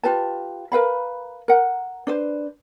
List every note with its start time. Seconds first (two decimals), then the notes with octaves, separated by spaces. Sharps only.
0.03 F4 G4 B4 A5
0.72 A#4 B4 F5 B5
1.48 A#4 F#5
2.07 D4 B4 C5